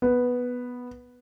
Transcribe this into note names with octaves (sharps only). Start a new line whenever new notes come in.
B3